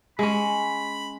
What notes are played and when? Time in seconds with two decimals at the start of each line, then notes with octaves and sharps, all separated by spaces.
0.19 G#3 C#4 B5